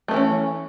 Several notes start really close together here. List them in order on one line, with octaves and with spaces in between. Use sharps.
A3 B3 E3 C#4